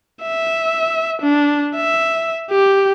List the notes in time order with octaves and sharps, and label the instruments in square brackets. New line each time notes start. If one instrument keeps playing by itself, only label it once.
[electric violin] E5
D4
E5
G4